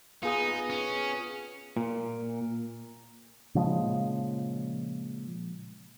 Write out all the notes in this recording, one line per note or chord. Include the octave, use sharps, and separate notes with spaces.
B3 D#4 F4 G#4 D#6
C#4
A#2
A#2 C#3 F3 G#3